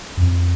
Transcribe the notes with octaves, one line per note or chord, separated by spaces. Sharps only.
F2